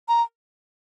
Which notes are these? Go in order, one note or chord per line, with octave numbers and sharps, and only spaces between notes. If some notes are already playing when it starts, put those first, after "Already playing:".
A#5